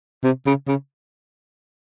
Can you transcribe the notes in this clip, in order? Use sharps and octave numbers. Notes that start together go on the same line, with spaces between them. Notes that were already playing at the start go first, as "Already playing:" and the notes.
C3
C#3
C#3